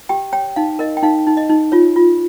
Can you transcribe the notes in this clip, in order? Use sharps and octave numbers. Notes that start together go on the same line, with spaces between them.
G4 G5
C#5 G5
D#4 F5
A#4 D#5
G5
D#4 F5
D#4
D#5
D#4
F4 C#5
F4